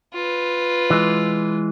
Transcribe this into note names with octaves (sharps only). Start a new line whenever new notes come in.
F4 B4
E3 G#3